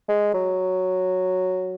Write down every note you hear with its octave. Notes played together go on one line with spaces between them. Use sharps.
G#3
F#3